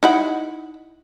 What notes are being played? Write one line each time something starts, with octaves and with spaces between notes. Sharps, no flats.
D#4 E4 F#5